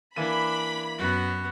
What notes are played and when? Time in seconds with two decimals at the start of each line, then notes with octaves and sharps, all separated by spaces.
0.16 E3 A#3 D4 B5 D#7
0.98 F#2 B3 F#4